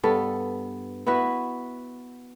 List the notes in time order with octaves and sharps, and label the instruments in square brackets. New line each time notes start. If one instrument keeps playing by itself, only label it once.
[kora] G2 B3 A4
B3 E4 F#4 B4